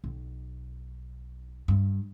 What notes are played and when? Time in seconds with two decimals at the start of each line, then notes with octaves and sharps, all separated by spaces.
0.04 B1
1.68 G2